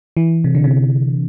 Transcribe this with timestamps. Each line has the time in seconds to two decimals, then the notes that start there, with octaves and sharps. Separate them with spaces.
0.17 E3
0.44 C3
0.55 D3
0.64 C3